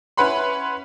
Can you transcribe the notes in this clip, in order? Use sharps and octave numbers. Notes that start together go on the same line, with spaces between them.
C#4 E4 B4 F#5 B5 C6